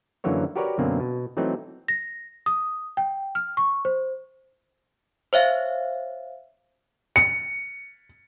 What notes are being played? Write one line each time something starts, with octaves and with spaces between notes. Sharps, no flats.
F#2 D3 E3 F#3 A#3 C#5
F#4 G4 A#4 B4 C#5 D5
F#2 B2 D3 F#3 A#3 C4
B2
E3 F#3 A3 C4 D#4
A#6
D#6
G5
F6
C#6
C5
C5 C#5 E5 F5
C#7